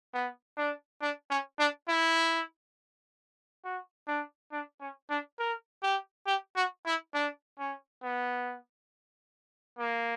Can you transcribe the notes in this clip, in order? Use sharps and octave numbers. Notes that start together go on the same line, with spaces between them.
B3
D4
D4
C#4
D4
E4
F#4
D4
D4
C#4
D4
A#4
G4
G4
F#4
E4
D4
C#4
B3
A#3